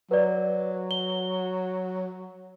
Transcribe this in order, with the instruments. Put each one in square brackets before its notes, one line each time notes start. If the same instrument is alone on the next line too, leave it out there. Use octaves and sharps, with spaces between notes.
[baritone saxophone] F#3 [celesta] B4 D5
[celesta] G7